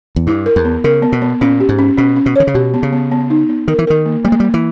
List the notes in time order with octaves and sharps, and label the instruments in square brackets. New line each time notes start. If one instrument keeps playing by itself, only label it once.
[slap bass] E2
[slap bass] G2 [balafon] E4
[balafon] A#4
[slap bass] E2
[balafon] B3
[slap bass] C#3 [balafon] A#4
[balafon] B3
[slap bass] B2
[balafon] B3
[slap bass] A#2 [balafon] C#4
[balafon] G4
[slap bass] G#2
[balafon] C#4
[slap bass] B2 [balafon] C#4
[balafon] C#4
[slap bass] B2
[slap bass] D#3 [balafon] C#5
[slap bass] C#3
[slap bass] B2 [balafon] G4
[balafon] B3
[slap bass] C#3
[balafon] B3
B3
D#4
B3
[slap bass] D#3 [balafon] A#4
[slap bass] E3
[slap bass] D#3 [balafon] A#4
[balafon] A#3
[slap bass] G3 [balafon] A#3
[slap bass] G#3
[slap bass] G3 [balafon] A#3
[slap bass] E3